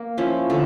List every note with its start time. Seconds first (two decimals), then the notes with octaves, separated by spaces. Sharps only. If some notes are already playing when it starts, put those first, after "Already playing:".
Already playing: A#3
0.18 F3 C#4 E4
0.50 D3 A3 D4